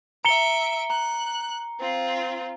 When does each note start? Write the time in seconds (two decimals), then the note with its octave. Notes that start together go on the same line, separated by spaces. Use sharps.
0.25 E5 A#5 C#7 D7 G7
0.90 A#5 F#6
1.80 C4 F4